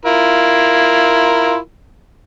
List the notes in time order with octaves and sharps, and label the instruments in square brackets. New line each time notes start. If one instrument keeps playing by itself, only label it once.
[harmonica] E4 F4 A#4